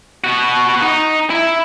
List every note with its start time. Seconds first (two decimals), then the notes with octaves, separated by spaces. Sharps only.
0.24 B3 F#4
0.82 D#4
1.30 E4